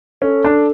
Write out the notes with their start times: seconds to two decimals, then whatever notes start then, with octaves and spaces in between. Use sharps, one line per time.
0.22 C#4 A4
0.45 D4